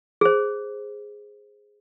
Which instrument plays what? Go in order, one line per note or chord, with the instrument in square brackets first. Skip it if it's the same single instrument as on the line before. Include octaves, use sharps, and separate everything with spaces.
[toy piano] G#4 C5